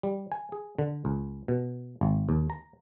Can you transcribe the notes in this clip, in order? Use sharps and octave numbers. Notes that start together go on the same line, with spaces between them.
G3
G#5
G#4
D3
C#2
B2
G#1
D#2
A#5